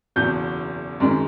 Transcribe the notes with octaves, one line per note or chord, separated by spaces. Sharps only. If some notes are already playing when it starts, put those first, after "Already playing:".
F#1 E2 B2 F#3 G6
F#2 D#3 G#3